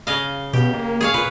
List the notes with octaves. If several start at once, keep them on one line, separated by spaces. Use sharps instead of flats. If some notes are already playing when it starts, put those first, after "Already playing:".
C#3 D#5 F5
B2 G4
A#3
G#4 C#5 F5
A#2 B4